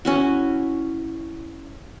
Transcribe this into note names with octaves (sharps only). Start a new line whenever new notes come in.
C#4 E4 F#4